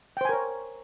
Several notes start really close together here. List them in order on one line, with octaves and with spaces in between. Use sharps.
G5 C5 G#5 A#4 C#5